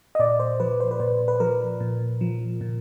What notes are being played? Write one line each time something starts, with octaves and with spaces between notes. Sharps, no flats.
D#5
A#2 D5
C5
F3 B4
C5
B4
A#2 C5
B4
F3 A#4
A#2
F3
A#2